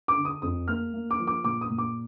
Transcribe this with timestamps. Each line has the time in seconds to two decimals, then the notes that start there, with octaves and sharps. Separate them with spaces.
0.08 D6
0.17 D3
0.25 D#6
0.42 F2 D#6
0.68 A#3 F6
0.94 A#3
1.11 D6
1.19 F3
1.27 D6
1.44 A#2 D6
1.61 D#6
1.70 A#2
1.78 D6